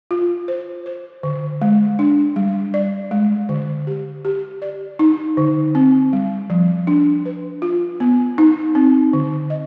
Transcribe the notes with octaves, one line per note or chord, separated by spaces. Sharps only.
F4
C5
C5
D3
G#3
D4
G3
D5
G#3
D3
G4
G4
D5
D#4
D3
C4
G3
F3
D4
B4
F4
B3
D#4
C4
D3
D#5